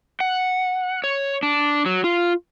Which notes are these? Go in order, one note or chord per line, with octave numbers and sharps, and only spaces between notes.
F#5
C#5
D4
F#3
F4